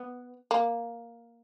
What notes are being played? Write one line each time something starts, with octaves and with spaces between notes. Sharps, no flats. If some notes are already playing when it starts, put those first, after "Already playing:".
Already playing: B3
A#3